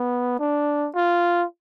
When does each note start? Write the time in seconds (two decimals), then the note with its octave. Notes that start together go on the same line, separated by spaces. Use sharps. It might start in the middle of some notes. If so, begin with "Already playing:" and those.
Already playing: B3
0.39 D4
0.95 F4